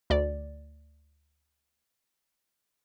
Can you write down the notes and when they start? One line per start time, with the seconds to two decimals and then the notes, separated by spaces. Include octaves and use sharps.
0.10 D2 D5